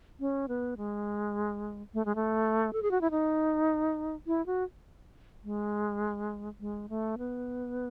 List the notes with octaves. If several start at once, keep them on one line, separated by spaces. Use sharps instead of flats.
C#4
B3
G#3
A3
G#3
A3
A4
G#4
F#4
E4
D#4
E4
F#4
G#3
G#3
A3
B3